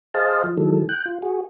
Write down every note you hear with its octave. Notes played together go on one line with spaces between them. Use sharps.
G#4 C5 D#5 F5 A5
F3
D#3 E3 F#3 G#3 A4
G5 F#6
F4
F#4 G#4